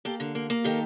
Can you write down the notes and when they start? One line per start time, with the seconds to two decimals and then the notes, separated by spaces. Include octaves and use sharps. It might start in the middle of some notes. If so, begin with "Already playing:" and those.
0.05 A#3 G4 A4
0.20 D3
0.35 A#3
0.50 A#3
0.64 D#3 G4 A4